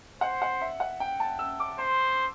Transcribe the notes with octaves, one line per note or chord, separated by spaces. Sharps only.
C5 F#5
F#5
E5
F#5
G5
A5
E6
D6
C5 C6